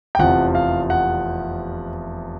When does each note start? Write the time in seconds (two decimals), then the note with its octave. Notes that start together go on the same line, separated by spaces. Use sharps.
0.15 G5
0.19 F1 E2 C3 F3 F#5
0.55 F5
0.90 F#5